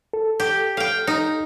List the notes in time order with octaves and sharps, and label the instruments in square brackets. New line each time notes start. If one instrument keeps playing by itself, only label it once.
[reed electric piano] A4
[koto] G4
F5 G5
D#4